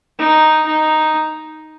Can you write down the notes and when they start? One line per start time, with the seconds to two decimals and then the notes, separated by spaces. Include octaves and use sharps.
0.19 D#4
0.66 D#4